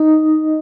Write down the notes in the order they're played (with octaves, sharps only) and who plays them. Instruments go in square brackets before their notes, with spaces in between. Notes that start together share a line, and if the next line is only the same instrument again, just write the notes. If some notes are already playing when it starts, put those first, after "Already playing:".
Already playing: [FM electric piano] D#4 D#5